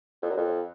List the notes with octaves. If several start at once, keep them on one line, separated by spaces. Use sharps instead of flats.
F2
F#2
F2